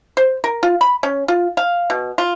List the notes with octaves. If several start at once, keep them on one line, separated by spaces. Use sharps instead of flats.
C5
A#4
F4
B5
C#4
F4
F5
B2
F4